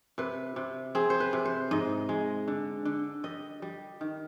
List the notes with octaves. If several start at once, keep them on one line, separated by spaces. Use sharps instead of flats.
C3 B4
C3
C4 G#4
C5
B4
C3
C5
G#2 D#5
G#3
D3
D3
G3 D#5
G3
D#3